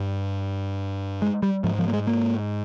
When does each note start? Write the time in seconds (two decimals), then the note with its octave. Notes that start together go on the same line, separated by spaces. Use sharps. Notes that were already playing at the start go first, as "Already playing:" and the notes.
Already playing: G2
1.22 G#3
1.43 G3
1.64 G#2 F3
1.79 F3
1.88 A#3
1.93 G#3
2.07 A#3